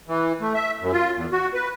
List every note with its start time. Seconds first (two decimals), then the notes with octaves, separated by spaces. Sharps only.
0.08 E3
0.41 A3
0.54 E5
0.81 F#2
0.93 F4
1.15 E2
1.32 F#4
1.54 B4